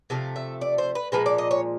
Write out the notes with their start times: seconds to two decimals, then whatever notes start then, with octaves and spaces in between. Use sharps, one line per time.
0.10 C3 F3 A3 F5
0.36 E5
0.61 D5
0.78 C5
0.95 B4
1.12 A#2 F3 G#3 B4
1.26 D5
1.38 D#5
1.51 C#5